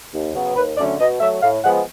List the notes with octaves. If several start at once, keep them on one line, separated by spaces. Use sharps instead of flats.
D#2
C#3 F#3 B3
D#2 B4
D3 F#3 A3 C#4 D5
B2 D#5
F#3 A3 E5
A2 F5
F3 G#3 B3 F#5